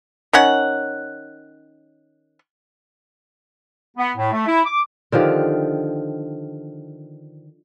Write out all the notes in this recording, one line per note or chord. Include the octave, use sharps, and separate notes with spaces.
D#3 C#4 F#5
B3
A2
A3
E4
D6
D3 D#3 F3 G4